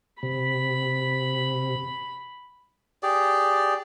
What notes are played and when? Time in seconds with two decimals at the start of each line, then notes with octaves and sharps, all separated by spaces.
0.23 C3 B5
3.03 G4 G#4 D5